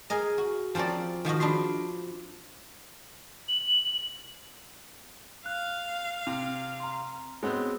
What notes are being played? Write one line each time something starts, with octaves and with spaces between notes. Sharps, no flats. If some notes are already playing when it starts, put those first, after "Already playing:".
G#4 A#4 D#5
F#4
F3 C4 C#4 A#4 D5
D#3 F3 F#4 D#5
D4 B4 D#5 C6
F#7
F5 F#6
C3
A#5 C6
G#3 B3 C4 F#4 G#4 C#5